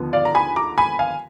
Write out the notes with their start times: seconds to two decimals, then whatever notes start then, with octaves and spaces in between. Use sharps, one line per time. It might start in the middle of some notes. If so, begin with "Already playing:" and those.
Already playing: D#2 D3 F3 B3
0.13 D5 F5
0.25 A#5
0.35 G#5 B5
0.56 A#5 D6
0.78 G#5 B5
0.99 F5 G#5